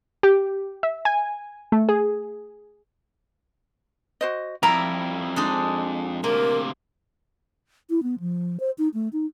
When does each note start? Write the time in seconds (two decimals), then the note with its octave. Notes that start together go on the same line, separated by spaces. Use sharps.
0.23 G4
0.83 E5
1.05 G#5
1.72 A3
1.89 G#4
4.21 F#4 C5 D#5
4.63 F2 G3 E4 A#4 A#5
5.36 G#3 D4 D#4
6.24 D2 C3 A#3 A#4
7.90 E4
8.03 B3
8.20 F3
8.60 C5
8.78 D#4
8.94 A3
9.13 D#4